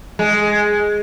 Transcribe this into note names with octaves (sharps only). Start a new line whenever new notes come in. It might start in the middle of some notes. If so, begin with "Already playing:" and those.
G#3